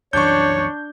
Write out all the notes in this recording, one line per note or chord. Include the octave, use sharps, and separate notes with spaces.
C2 F#2 E3 D4 C#5 C#6 G6